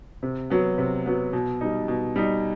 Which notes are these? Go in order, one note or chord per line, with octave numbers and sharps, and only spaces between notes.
C3
F#3 B3
C3
F#3 B3
B2
G3 D#4
B2
G3 D#4